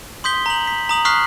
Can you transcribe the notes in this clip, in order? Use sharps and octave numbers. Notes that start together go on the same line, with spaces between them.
C6 D#6 G6 B6 G7
A#5 F#7
B6
A#5 D#6 F#7
C#6 D#6 F6 F#6 B6 C7